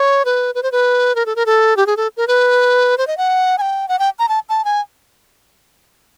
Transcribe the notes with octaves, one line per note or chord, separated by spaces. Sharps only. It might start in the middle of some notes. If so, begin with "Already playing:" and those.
Already playing: C#5
B4
B4
C5
B4
A#4
A4
A#4
A4
G4
G#4
A4
A#4
B4
C5
D#5
F#5
G#5
G5
F#5
G5
A#5
A5
A5
G#5